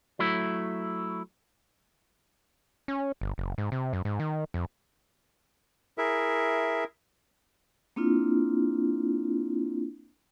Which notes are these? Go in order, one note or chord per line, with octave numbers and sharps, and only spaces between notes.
F#3 A3 E4
C#4
G1
F#1
G#2
C3
F#2
G#2
D#3
F2
E4 G#4 A#4 E5
A#3 C4 D4 E4 F4